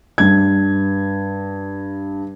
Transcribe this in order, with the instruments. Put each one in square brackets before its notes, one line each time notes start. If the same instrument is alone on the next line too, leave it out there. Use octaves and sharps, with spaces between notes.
[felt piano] G2 G#6